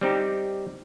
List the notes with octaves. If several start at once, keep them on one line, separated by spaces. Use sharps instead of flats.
G3 C4 D#4 G4